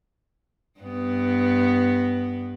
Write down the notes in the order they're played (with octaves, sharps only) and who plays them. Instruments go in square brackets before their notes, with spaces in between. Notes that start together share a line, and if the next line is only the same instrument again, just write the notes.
[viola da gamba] G2 B3